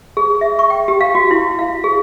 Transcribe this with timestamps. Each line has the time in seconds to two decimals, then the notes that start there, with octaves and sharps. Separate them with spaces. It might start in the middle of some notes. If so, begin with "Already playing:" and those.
0.17 G#4
0.41 E5
0.59 C#6
0.70 G5
0.88 G4
1.01 F5
1.15 F#4
1.31 E4
1.59 F5
1.84 G#4